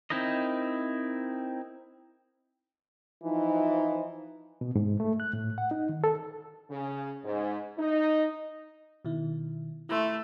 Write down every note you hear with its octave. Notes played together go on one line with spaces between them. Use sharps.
C4 D#4 E4 A#4 D#5
E3 F3 D#4
B2
G#2
A3
F#6
A2
F#5
D#4
D#3
A4
C#3
G#2
D#4
B2 D#3 E4
A3 E4 B5 C6